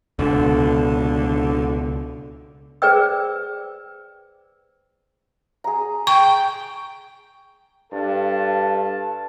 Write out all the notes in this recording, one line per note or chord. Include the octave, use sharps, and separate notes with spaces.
C#2 B2 D3
G#4 B4 C5 D5 G5 E6
G#4 A#5
G5 C#6
G2 A4 F5 A5